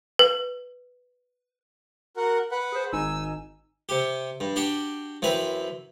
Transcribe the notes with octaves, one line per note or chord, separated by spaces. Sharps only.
B4
F#4 A#4 F#5
B4 F#5
G#4 C5
G#1 D#4 G#5 E6
C3 G4
G2
D4 F#4 G4
F#2 E3 C4 B4